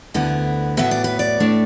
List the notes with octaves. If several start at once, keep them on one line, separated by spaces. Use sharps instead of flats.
D2 D3 B3 E4
A2 F#3 B3 E5
D5
B4
D5
A2 A3 D4